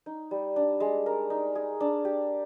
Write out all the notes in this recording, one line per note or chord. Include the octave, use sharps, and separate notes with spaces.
D#4
G3
D4
G#3
A#4
D#4
G#4
D4
G4